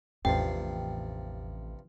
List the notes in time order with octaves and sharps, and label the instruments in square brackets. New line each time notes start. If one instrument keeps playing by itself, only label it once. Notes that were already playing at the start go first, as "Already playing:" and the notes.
[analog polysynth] A1 [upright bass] E2 [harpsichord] G2 C3 F3 [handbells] G5